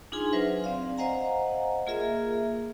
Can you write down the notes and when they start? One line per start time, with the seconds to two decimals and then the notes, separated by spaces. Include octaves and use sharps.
0.12 D4 D#4 F4 G#4 G#5 C6
0.33 F#3 F4 B4 C5 E5
0.64 C4 D5 F5
0.98 C5 D#5 F5 F#5 G#5 A#5
1.87 A#3 F4 G#4 A#4 E5